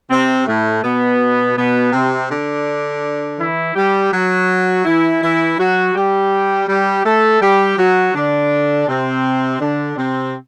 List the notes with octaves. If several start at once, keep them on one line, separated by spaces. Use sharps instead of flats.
C3 C4
A2 A3
B2 B3
B2 B3
C3 C4
D3 D4
E3 E4
G3 G4
F#3 F#4
E3 E4
E3 E4
F#3 F#4
G3 G4
G3 G4
A3 A4
G3 G4
F#3 F#4
D3 D4
C3 C4
D3 D4
C3 C4